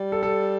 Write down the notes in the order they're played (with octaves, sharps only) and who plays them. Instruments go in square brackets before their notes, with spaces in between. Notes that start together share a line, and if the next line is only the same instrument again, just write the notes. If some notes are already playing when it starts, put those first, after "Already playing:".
Already playing: [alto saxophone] G3
[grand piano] A4
A4